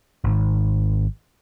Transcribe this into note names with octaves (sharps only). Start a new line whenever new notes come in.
G#1